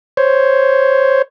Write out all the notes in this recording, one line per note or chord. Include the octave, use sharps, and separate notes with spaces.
C5 C#5